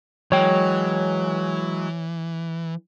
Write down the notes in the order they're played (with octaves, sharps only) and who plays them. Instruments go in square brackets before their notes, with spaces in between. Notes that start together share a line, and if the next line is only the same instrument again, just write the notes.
[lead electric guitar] E3 [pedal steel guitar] F#3 G#3 [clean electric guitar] C#5 G5